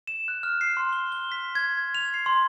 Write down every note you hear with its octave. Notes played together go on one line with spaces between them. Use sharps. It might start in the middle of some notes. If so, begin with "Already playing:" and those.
E7
F#6
F6
C7
C6
G7
G7
B6
G#6
F7
C7
C6